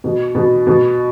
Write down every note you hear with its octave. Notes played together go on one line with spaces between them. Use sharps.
B2
B2
B2